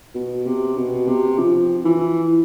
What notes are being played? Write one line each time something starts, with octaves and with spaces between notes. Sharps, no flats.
B2
C3
B2
C3
F3
E3